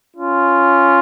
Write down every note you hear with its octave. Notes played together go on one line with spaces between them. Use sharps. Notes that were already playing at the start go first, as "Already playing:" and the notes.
C#4 F4